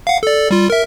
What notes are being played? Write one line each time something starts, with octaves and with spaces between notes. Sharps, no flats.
F5 F#5
A4 D5
G3 F4
A#4 E5